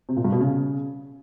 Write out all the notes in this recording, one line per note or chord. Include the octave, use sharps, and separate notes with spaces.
C3
A#2
G2
B2
C#3